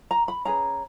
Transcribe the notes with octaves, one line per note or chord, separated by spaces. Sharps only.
A#5
B5
C#4 G#4 B4 A#5